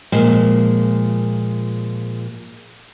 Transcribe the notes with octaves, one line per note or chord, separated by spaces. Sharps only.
A#2 F3 G#3